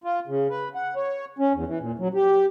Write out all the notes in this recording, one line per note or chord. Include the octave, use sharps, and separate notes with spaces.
F4
C#3
B4
F#5
C#5
C#4
E2
E3
A#2
F#3
G4